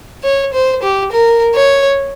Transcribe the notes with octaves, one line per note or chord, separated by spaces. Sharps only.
C#5
C5
G4
A#4
C#5